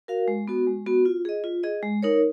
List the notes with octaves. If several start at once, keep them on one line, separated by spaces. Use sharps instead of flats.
F#4 A#4 F5
G#3
B3 F#4
G#3
B3 F#4
F4
G#4 D#5
F4
G#4 D#5
G#3
D#4 A#4 C#5